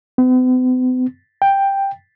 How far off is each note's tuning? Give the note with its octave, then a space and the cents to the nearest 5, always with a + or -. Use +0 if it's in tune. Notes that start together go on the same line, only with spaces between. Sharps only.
B3 +45
G5 +5